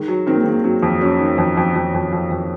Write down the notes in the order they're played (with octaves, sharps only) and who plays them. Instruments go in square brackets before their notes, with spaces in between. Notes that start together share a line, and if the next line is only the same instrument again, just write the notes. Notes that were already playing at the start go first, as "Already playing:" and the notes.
Already playing: [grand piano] D#3 [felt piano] G#3
[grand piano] F#3
[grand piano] D#3 [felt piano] C4
[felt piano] A#3
G#3
[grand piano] D#3 [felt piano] A#3
[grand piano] F#3 [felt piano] C4
[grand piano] F2
[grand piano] F#3 [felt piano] C#4
[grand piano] D#3
F2
F2
F2
F2
F2
F2